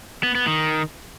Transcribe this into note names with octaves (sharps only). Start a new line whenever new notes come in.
B3
B3
D#3